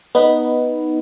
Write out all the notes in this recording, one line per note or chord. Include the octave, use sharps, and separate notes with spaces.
B3 D#4 B4